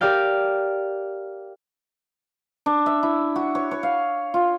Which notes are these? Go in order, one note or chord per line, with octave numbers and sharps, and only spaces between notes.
G4 A#4 D5 F5 G5
D4
E5
E4
F#4
C#5
C#5
F5
F4